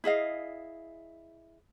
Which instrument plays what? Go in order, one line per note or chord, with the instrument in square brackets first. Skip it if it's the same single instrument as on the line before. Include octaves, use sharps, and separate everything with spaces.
[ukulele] E4 G#4 D#5 F5